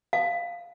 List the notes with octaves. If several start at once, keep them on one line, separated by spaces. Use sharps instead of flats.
F5